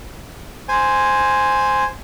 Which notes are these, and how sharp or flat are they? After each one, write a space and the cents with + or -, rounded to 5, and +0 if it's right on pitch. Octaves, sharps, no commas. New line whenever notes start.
C5 +0 G#5 +0